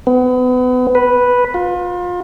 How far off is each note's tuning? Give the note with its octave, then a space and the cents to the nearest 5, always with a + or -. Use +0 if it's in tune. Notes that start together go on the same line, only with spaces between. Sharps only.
B3 +30
B4 -5
F4 +30